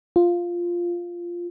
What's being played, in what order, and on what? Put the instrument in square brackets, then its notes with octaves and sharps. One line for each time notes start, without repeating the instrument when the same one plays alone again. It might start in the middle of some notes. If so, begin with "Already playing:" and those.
[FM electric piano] F4